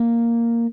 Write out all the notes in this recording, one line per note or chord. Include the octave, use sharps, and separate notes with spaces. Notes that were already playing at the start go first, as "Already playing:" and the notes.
Already playing: A#3